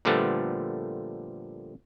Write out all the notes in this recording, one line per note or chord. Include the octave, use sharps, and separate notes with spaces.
A#2 D3 F3 G3 A3 B3